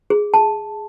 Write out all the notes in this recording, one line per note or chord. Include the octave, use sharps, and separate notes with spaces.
G#4
A5